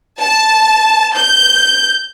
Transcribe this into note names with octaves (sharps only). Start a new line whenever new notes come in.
A5
G6